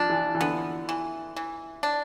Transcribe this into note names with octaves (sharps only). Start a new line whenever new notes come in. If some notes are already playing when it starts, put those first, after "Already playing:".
Already playing: F3 D4
E3
E3
D3 B3
E3
E3
D4